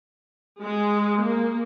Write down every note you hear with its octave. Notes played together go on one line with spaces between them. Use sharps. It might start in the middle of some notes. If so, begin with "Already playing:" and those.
G#3
A#3